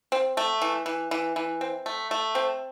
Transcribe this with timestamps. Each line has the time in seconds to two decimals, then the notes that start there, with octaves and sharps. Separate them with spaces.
0.12 C4
0.37 A3
0.62 E3
0.86 E3
1.11 E3
1.36 E3
1.61 C4
1.86 A3
2.11 A3
2.35 C4